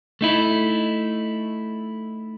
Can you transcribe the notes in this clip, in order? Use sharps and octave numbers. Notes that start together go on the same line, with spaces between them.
A3 D#4 E4